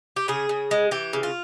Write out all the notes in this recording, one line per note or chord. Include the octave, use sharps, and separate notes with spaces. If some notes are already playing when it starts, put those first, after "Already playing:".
G4
C#3 G#4
C#3
G#3
E3 G4
C#3
F4